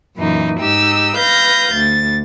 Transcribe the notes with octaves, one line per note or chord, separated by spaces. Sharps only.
F#2 A#2 E3 D#4
G#2 D#4 G4 E6
B4 F5 G6 A#6
D2 A6